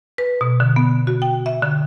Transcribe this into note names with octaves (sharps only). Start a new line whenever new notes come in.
B4
B2
D3
B3
F#4
G5
E5
D3